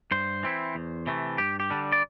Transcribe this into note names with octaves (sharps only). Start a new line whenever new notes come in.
G2 C5
E3 C4 E4
E2
C3 E3 A3
G2 G4
G4
D3 G3 D4
D5